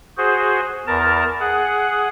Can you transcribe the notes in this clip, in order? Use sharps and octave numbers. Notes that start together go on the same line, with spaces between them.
F#4 G#4 C5
E2 A#4 A5
G#4 F#5